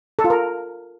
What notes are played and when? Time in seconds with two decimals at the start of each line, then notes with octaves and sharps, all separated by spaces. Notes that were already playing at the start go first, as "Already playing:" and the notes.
0.19 A4
0.24 F4
0.30 A#4